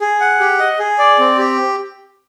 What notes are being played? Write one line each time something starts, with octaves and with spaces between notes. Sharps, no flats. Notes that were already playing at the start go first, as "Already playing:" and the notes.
G#4
F#5
G4
D#5
G#4
D5
C4
G4